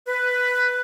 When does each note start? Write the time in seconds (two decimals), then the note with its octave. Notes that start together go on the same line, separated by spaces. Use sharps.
0.06 B4